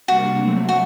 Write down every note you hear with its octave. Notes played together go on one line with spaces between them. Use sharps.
C3 G3 A#3 D4 F#4
F#3 A3 C4
F#4